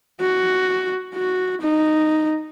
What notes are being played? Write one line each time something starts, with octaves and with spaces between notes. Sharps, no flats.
F#4
F#4
D#4